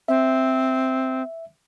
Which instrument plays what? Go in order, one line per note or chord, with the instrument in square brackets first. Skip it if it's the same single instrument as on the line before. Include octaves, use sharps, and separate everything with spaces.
[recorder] C4 [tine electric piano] E5